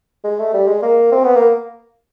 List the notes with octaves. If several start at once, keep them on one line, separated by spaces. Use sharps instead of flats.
G#3
A3
G3
G#3
A#3
C4
B3
A#3